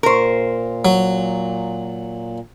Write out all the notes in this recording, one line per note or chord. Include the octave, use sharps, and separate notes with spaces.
A#2 A#4 C5
F#3